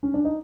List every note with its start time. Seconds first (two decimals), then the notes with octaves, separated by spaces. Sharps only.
0.03 C#4
0.14 D4
0.25 D#4